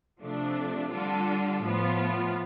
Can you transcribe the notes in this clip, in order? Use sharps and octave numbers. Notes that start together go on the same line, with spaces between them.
C3 F3 A3 D4
D3 G3 D4 F4 A4
A2 F3 B3 F4